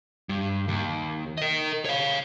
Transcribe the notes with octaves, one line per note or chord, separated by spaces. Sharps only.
G2
D#2
A#4 D#5
C#5 F5